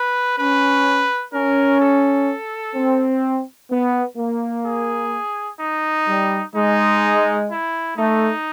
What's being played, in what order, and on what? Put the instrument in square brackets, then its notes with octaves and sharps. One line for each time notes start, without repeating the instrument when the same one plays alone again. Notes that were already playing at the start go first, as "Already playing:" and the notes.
Already playing: [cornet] B4
[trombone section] C#4 [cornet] B4
[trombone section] C#4 [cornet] A#4
[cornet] A4
[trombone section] C4
B3
A#3
[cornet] G#4
D#4
[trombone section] G3
[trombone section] G#3 [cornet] D#4
[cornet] E4
[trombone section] A3 [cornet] D#4